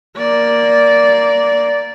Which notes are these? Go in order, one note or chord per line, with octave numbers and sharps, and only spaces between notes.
A#3 D5